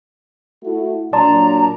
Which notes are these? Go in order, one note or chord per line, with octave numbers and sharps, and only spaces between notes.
A3 E4 F#4
A#2 F#3 D4 D5 A5 A#5 C6